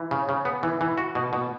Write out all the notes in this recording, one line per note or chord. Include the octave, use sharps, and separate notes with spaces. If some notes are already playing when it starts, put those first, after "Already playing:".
Already playing: E3
C#3
C#3
B3
E3
E3
F#4
B2
B2